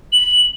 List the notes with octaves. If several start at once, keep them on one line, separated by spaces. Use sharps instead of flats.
F#7